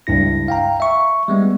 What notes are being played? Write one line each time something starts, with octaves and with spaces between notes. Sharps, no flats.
C#2 G2 E4 A#6
F5 G5 A#5
E5 C#6
G3 G#3 B3